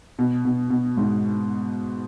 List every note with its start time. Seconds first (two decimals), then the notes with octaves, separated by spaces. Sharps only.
0.19 B2
0.45 B2
0.70 B2
0.97 G#2